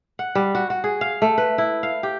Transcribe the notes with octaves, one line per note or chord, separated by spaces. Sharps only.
F#5
G3
F#4
F#4
G#4
F5
A3
B4
E4
F5
G4